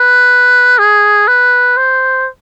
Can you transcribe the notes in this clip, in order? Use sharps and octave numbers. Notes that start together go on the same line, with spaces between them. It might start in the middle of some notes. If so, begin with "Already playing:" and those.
Already playing: B4
G#4
B4
C5